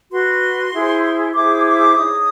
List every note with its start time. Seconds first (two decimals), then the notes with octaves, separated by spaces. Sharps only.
0.11 F#4 B4 C6
0.73 E4 G#4 C5
1.34 E4 G#4 C5 D6
1.55 D#6
1.66 D6
1.97 D#4 G#4 C#5 D#6